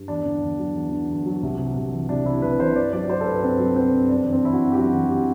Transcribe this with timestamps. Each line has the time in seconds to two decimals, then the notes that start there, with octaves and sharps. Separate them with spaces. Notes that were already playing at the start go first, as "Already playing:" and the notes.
Already playing: G2
0.08 E2 D4
0.25 D3
0.42 E2
0.59 F#3
0.75 E2
0.92 D3
1.09 E2
1.26 F#3
1.43 C2
1.59 C3
1.76 C2
1.93 E3
2.09 C2 D4
2.25 C3 E4
2.42 C2 B4
2.59 E3 C5
2.76 G2 D5
2.93 F#3 D5
3.09 F#3 C5
3.21 A4
3.26 G2 B4
3.42 G2 C4
3.59 F#3
3.76 F#3 C4
3.92 G2
4.09 F#2 D4
4.26 E3
4.32 C4
4.43 E3 E4
4.53 F#4
4.60 F#2
4.72 G4
4.76 F#2 F#4
4.93 E3
5.09 E3 G4